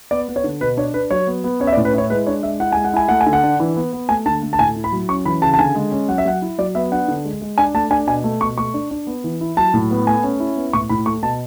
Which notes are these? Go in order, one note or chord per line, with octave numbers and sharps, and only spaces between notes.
B3 D5
B3
C#5
D3
B2 B4
D4 C#5
D4 B4
F#3 C#5
B3
B3
C#4 C#5
E5
D5
A2
B4
E4 C#5
G#3 B4
D4 C#5
G#3 E5
E4 F#5
G#3 G#5
F#5
E4 G#5
A3 F#5
G#5
D3
F#5
D4
E3
B3
B3
A3 G#5
D3 A5
A3
A5
A2 G#5
E4
B5
F#3
C#4 C#6
E3 B5
C#3 A5
A5
D3 G#5
G#3
C#4
F#3 F#5
E5
F#3 F#5
E4
F#3 D5
B3 E5
D4 F#5
D3
G#3
G#3
D4 G#5
A3 A5
D4 G#5
B2 G#5
A3
B2 C#6
A3 C#6
D4
D4
B3
E3
E4
F#3 A5
A2
B3
A3 G#5
C#4
E4
B3
A2 C#6
A2 B5
A3 C#6
B2 A5